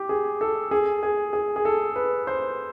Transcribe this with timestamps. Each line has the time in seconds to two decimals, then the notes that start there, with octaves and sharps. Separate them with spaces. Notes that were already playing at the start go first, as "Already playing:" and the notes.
Already playing: G4
0.09 G#4
0.41 A4
0.71 G#4
1.03 G#4
1.33 G#4
1.56 G#4
1.65 A4
1.96 B4
2.27 C5